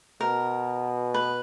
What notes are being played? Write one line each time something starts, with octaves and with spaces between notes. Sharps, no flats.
B2 A#4
B4